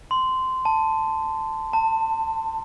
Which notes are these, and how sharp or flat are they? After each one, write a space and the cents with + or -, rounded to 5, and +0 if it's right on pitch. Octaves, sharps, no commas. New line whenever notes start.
C6 -15
A5 +5
A5 +25